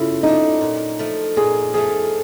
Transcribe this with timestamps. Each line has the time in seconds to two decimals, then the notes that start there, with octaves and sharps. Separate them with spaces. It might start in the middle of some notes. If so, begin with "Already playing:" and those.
Already playing: C#3 A3 E4 F4
0.23 F#3 A3 D4 D#4
0.61 A#2
0.99 F3 A3
1.36 A#2 G#4
1.74 F3 A3 G#4